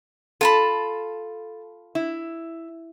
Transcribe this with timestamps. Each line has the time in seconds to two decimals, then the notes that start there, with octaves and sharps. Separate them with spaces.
0.41 F4 A4 A5 B5
1.95 E4